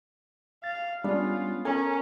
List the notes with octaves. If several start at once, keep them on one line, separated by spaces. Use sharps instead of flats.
F5 A6
G3 G#3 B3 C#4 D4 F4
C#4 A4 A#4 G#5